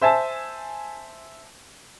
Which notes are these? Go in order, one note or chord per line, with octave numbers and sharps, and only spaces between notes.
C5 E5 G#5 A5